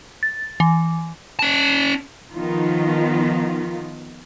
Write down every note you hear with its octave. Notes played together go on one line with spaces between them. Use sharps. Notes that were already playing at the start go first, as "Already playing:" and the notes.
A6
E3
C#4 A5
D#3 F3 B3 D#4 F4